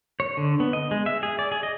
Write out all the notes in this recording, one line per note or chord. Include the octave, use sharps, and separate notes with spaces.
C#5
D3
B3
D#5
G#3
E5
G#4
D5
G#4
D#5